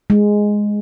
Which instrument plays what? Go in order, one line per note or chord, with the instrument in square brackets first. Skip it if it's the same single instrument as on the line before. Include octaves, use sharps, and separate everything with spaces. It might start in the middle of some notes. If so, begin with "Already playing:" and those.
[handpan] G#3